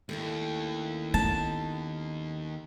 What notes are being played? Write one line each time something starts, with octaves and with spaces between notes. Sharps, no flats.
D#2 A3 C#4 E4
B3 A5